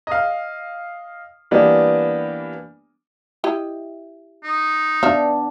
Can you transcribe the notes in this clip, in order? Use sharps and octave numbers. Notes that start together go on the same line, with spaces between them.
D#5 F5
E3 G3 A#3 B3 D4
E4 G4 D#5
D#4
B3 D4 D5 E5 F5